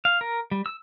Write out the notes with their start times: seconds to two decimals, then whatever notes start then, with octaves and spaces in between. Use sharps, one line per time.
0.05 F5
0.21 A#4
0.51 G3
0.66 E6